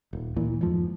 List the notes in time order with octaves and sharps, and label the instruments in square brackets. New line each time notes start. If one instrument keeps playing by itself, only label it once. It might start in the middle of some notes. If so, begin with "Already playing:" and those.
[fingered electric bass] D#1
D#2 A#2 E3
F2 G#2 F3